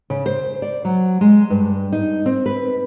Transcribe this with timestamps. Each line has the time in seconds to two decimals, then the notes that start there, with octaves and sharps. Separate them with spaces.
0.10 C#3
0.26 C5
0.62 D5
0.85 F#3
1.21 G#3
1.50 G2
1.92 D#4
2.26 C4
2.46 B4